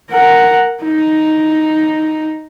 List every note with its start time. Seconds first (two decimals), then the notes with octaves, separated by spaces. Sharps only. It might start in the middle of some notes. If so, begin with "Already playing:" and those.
0.10 A#4 F#5
0.83 D#4